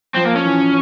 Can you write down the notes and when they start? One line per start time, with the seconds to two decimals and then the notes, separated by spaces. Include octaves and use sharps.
0.15 F3 C4
0.25 A#3
0.36 C#4
0.45 E3